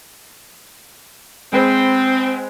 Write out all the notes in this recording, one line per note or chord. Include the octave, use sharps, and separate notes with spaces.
G#3 C4 B4 C5